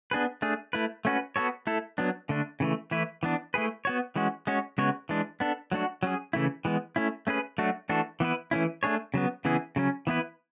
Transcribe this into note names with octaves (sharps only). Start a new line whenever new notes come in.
B3 D4 G#4 B4
A3 D4 G#4
A3 E4 B4
A3 C#4 F#4 B4
B3 F#4 A4 C#5
A3 E4 A4
F#3 B3 D4
D3 A3 D4
C#3 E3 A3
E3 A3 E4 B4
E3 B3 D4
A3 E4 G#4 B4
B3 F#4 C#5
E3 G#3 C#4 F#4
G#3 C#4 F#4 C#5
C#3 G#3 B3 F#4 C#5
E3 G#3 D4
B3 D4 A4
F#3 A3 D4 F#4
F#3 C#4 G#4
C#3 E3 A3 E4
E3 G#3 B3
A3 C#4 E4
A3 C#4 G#4 B4
F#3 A3 D4 F#4
E3 A3 D4 F#4 A4
E3 B3 E4 B4
E3 A3 C#4 E4
A3 D4 G#4 C#5
C#3 F#3 B3
C#3 E3 B3 E4 G#4
C#3 F#3 C#4
E3 B3 E4 B4